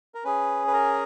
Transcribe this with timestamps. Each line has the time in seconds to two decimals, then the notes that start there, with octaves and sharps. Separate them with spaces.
0.15 A#4
0.24 C#4 G#4 B4
0.67 B4
0.73 A#4